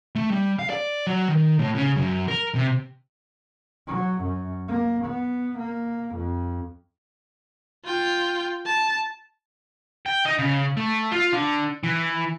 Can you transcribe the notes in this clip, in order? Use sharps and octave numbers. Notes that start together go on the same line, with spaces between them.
A3
G3
F5
D5
F#3
D#3
A2
C#3
F#2
A#4
C3
F#3
F#2
A#3
B3
A#3
F2
F4 G5
A5
G5
D#4
C#3
A3
F4
D3
E3